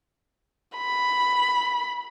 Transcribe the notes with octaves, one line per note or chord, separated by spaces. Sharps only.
B5